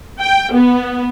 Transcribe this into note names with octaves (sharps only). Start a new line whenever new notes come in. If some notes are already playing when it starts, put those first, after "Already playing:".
G5
B3